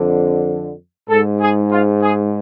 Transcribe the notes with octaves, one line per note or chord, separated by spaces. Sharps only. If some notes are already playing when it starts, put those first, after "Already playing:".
Already playing: F2 D3
G#2 A4
G#4
F4
G#4